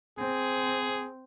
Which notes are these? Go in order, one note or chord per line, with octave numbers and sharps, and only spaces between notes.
C4 G#4